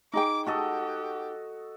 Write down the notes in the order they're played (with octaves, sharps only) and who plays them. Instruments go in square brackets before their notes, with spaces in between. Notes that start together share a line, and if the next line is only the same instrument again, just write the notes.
[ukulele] D#4 G#4 G5 [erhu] D6
[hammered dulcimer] F#4 A4 D#5 [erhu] G4